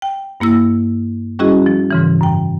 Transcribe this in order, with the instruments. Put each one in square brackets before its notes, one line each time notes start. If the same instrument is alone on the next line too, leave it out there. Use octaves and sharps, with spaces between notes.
[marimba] G5
G2 A#3 E4 E6 A#6
G3 C#4 E4 F#4 G#4 D#5
F3
G#2 C#3 E3
F#2 G5